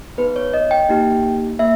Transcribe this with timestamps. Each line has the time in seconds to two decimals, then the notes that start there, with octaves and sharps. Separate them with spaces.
0.18 B3 D#4 G#4 B4
0.36 C#5
0.54 D#5
0.71 G5
0.89 A#3 D#4 G4
1.59 A#3 E5